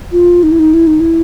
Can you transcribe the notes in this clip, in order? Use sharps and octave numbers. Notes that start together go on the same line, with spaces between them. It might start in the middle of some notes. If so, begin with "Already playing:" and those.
F4
D#4
E4
D#4
E4
D#4
E4